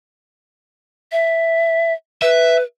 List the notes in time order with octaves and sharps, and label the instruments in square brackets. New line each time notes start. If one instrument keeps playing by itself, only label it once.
[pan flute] E5
[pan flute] B4 [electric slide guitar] E5